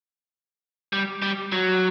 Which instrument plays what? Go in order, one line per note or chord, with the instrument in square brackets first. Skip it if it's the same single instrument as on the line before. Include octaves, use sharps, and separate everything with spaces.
[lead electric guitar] G3
G3
F#3